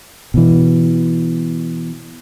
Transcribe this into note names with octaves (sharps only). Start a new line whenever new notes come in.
B2 E3